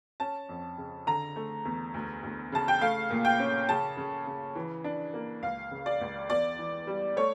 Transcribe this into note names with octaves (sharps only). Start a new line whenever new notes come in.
C#4 A5
F2
C#3
D3 A#5
A3
E2
D2
D2
C#3 A5
G5
A3 F5
A#2
G5
C#4
C#3 A5
C#3
C#3
E3
D4
A#3
C#2 F5
C#3
D5
C#2
E2 D5
E3
G3
A3 C#5